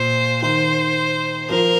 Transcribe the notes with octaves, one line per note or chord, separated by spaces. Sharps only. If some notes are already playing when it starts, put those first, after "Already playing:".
Already playing: A#2 C5
D#3 C5
F3 A#4